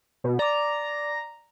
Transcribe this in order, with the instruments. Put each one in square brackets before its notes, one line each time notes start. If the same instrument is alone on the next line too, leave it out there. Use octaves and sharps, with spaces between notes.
[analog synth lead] B2
[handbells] D5 D6 [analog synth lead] A#5